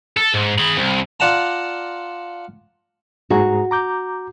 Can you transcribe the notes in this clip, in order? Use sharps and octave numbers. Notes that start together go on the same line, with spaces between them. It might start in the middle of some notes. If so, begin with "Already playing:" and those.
A4
G#2
G#4 B5
C2
F4 D5 F#5 A5 A#5
G#2 F#4 G#4 A#5
A#5 D6 G6